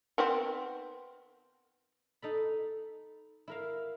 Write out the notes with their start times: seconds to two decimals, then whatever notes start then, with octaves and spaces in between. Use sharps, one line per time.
0.18 D#3 B3 C4
2.22 D#4 A4 B5
3.48 E4 A#4 F5